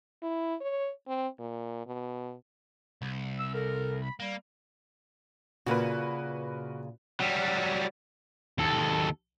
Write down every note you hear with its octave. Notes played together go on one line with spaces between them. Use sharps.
E4
C#5
C4
A#2
B2
C2
E6
A4 A#4
B5
G3 A#3
A#2 C#3 F#4 A#4 B4
F#3 G3
D#2 A4